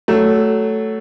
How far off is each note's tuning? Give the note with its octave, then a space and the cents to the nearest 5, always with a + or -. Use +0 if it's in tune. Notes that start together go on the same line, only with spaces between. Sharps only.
F#3 +15 A3 +0